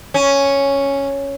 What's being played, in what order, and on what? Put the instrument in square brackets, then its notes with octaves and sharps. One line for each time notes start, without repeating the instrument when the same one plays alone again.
[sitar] C#4